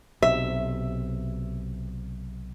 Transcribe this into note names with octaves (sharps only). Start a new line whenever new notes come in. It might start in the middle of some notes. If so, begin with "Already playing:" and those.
B1 C3 E5